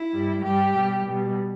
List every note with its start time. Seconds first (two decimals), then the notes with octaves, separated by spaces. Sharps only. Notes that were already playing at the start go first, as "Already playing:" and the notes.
Already playing: E4
0.13 G2 G3
0.44 G2 G3 G4
0.76 B2 G3
1.07 B2 G3